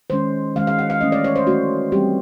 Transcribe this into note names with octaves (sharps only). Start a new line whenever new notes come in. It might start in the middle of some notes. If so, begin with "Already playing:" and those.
D#3 G#3 C#4 C5
D#3 G#3 C#4 F5
F5
F#5
F5
E3 A3 C#4 D#5
D5
C#5
C5
E3 A3 C#4 F#4
E3 G3 C4 G4